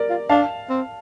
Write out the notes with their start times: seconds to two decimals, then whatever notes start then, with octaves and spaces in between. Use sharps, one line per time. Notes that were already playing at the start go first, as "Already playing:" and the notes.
Already playing: A#4 D5
0.10 F4
0.29 D4 F5 A5
0.70 C4